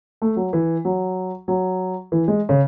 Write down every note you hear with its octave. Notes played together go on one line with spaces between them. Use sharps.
A3
F#3
E3
F#3
F#3
E3
G#3
C#3